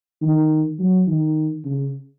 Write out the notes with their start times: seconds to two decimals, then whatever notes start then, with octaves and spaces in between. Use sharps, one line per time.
0.22 D#3
0.79 F#3
1.07 D#3
1.65 C#3